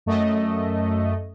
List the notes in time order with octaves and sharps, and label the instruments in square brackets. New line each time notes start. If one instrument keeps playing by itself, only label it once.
[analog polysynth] F#2 A3 D#5